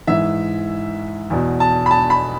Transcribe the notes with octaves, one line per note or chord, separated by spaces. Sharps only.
G#2 E3 E5
E2 B2
A5
B5
A5
B5